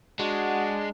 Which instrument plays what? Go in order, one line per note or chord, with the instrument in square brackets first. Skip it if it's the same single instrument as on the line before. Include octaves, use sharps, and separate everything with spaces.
[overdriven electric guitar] G#3 [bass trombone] D4 [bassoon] F#4 [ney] F#5